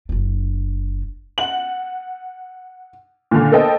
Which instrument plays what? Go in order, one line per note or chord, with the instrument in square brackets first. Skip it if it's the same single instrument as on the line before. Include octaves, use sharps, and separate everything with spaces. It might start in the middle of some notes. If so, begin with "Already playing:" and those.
[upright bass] F#1 D4
[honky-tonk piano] F#5 F#7
A#2 D3
A#3 B3 A4 C5 D#5 G5